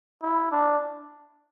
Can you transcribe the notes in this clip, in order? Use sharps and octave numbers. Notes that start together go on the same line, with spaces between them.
E4
D4